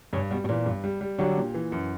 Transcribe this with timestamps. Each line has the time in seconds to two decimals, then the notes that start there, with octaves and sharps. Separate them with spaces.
0.13 G2 C#3
0.31 B2 G3
0.44 B2
0.49 A#2 E3
0.66 G2
0.84 G3
1.01 G3
1.18 D3 F#3 G4
1.37 A#2
1.54 E3
1.72 F#2